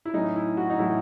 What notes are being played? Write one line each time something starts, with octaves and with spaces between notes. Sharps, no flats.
E4
A2 F#3 C#4 D#4
E4
F#4
D#4
A2 F#3 C#4 E4